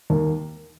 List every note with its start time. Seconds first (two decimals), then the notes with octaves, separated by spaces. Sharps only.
0.10 D#2 A#3